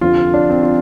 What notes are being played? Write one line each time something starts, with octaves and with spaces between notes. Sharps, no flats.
F1 F2 D3 F4
D4
C4
F4